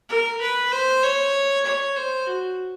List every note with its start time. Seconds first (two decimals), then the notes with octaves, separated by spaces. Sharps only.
0.09 A#4
0.41 B4
0.72 C5
1.03 C#5
1.66 C#5
1.96 C5
2.27 F#4